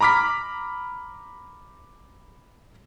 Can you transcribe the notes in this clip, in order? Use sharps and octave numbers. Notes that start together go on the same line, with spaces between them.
A#5 B5 D6 F6 B6